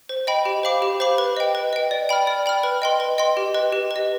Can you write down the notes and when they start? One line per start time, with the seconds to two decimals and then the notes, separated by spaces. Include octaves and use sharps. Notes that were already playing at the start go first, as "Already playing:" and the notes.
0.09 C5
0.27 D#5 G5 B5
0.45 G4
0.63 C5 F5 B5 D6
0.82 G4
1.00 C5 F5 B5 D6
1.18 B4
1.37 D#5 G5
1.55 B4
1.73 D#5 G5
1.91 D5
2.09 G5 B5 F6
2.27 D5
2.46 G5 B5 F6
2.63 B4
2.82 D#5 G5 C6
3.00 B4
3.18 D#5 G5 C6
3.37 G4
3.54 B4 D#5
3.72 G4
3.91 B4
3.96 D#5